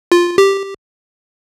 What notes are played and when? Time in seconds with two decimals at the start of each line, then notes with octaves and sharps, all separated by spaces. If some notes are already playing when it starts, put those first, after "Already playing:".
0.12 F4
0.38 G4